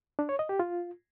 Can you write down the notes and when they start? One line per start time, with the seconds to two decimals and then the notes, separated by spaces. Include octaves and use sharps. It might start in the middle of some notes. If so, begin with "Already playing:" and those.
0.19 D4
0.29 C#5
0.39 D#5
0.49 G4
0.60 F4